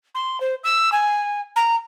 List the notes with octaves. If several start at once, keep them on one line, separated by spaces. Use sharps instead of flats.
C6
C5
E6
G#5
A#5